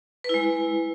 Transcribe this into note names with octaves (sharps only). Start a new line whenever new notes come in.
G#3 E4 B4